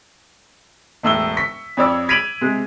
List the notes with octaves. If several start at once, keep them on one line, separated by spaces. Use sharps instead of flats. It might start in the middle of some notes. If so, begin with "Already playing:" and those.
E1 A2 E6 G7
C#6 B6
F2 C#5 D5 E6
G#6 B6 D7 D#7 F7 F#7
C3 G#3